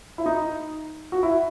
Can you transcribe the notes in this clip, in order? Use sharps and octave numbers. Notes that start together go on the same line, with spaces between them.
E4
D#4
F#4
E4